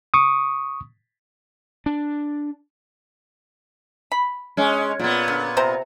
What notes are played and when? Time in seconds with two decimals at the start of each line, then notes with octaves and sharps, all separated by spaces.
0.14 C#6 D#6
1.86 D4
4.12 B5
4.57 G#3 C#4
4.99 A#2 B3
5.28 D3
5.57 C3 C5 A#5